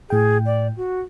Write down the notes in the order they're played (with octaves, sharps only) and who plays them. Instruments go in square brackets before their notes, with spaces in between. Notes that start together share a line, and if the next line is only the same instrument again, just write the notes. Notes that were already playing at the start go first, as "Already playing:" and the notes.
[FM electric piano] A2 G5 [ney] G#4
[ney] D5
F#4